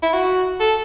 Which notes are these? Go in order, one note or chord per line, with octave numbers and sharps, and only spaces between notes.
E4
F#4
A4